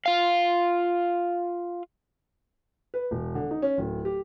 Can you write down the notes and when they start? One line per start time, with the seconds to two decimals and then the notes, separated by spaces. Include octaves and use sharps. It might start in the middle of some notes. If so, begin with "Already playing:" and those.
0.06 F4 F5
2.94 B4
3.11 E1
3.35 D3
3.51 D#4
3.62 C#4
3.78 D1
4.05 G4